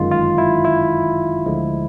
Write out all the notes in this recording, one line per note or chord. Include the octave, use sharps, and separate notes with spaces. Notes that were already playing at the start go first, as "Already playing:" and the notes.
Already playing: G1 F#2 D#3 G#3 F4
F4
E4
E4
D2 D3 F3 G#3